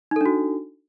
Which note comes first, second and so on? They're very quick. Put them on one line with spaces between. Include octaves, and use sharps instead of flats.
D#4 A4 D4 F#4